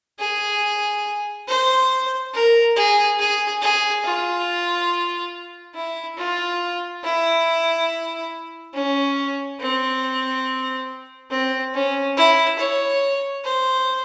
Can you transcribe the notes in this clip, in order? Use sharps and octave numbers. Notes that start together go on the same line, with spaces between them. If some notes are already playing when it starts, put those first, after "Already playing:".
G#4
C5
A#4
G#4
G#4
G#4
F4
E4
F4
E4
C#4
C4
C4
C#4
E4
C#5
C5